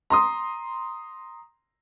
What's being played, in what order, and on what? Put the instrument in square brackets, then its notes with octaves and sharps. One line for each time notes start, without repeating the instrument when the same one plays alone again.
[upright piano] A#5 C6 D#6